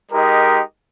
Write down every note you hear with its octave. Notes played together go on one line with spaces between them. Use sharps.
G#3 D#4 G4 A#4